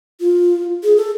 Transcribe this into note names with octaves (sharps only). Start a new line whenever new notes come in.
F4
G#4
A4